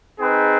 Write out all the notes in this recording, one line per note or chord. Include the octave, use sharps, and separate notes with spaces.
C4 D#4 G#4 B4